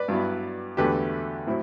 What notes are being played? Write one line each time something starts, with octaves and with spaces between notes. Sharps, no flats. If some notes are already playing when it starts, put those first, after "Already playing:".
Already playing: B4 D5
G2 F#3 B3 E4
E2 D3 F#3 A3 G4 B4
A2 F#3 C4 E4